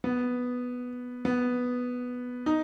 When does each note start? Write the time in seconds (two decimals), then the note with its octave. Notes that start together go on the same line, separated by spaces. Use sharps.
0.04 B3
1.25 B3
2.46 D#4